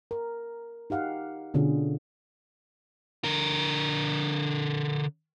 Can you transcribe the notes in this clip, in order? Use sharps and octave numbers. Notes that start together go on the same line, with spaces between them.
A#4
D#4 G4 F5 F#5
B2 D3 C#4 F4 G#4
D3 A#4